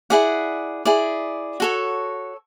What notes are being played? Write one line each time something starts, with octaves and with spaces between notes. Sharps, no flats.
E4 G#4 D5 F#5
E4 G#4 D5
F#4 A4 C#5